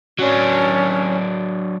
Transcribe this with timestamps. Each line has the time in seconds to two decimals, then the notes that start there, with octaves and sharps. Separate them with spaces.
0.19 F#3 C#4 D4